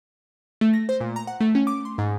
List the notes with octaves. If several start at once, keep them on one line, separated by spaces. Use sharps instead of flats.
A3
A#6
C5
A#2
A#5
F#5
A3
C#4
D6
C6
G#2